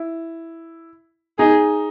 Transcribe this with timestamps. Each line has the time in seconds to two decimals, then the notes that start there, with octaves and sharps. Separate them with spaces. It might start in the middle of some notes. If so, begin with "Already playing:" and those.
Already playing: E4
1.38 D#4 G#4